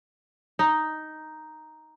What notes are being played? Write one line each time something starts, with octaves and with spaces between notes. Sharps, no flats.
D#4